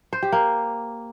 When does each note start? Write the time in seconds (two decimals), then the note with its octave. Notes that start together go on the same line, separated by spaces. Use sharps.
0.13 C5
0.22 G4
0.32 A#3